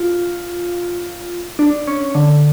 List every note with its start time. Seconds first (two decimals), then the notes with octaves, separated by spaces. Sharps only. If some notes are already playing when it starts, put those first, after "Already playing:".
Already playing: F4
1.59 D4
1.87 C#4
2.15 D3